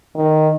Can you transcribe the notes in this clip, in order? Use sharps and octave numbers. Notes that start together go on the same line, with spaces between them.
D#3